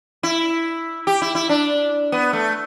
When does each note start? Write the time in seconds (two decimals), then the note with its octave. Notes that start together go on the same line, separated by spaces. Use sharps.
0.23 E4
1.07 G4
1.22 E4
1.35 E4
1.49 D4
2.12 B3
2.33 A3